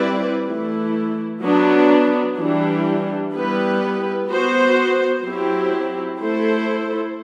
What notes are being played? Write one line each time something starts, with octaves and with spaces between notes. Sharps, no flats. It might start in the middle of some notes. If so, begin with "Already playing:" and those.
Already playing: G3 C4 E4 B4 D5
E3 A3 E4
F#3 B3 D4
E3 G3 D4 G4
G3 B3 E4 G4 B4
B3 F#4 C5
F#3 C4 E4 G4
A3 E4 A4 C5